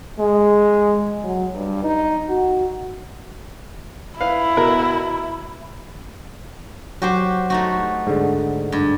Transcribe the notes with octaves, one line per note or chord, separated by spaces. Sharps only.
G#3
F#3
G2
D#4
F#4
E4 B4 F5
B2 A#4
F#3 F#4 G4 C5
A3 D#4 F#4
G#2 D3
G2